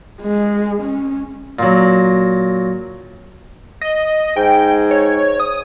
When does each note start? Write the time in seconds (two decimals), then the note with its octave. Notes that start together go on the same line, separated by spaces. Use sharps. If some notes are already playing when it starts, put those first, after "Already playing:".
0.22 G#3
0.82 C#4
1.59 A#2 F#3
3.81 D#5
4.36 G#2 G5
4.91 C#5
5.40 D#6